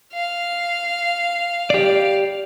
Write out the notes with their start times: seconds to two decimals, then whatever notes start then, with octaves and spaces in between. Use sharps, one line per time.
0.13 F5
1.70 G4 D5